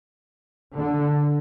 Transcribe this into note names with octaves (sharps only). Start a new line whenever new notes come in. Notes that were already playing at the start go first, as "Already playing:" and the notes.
D3